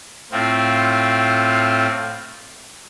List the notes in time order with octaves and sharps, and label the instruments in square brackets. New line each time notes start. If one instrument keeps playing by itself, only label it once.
[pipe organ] A2 C4 F4